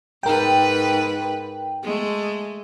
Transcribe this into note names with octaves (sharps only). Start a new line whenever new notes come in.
G#2 A#4 B4 G5
G#3 A3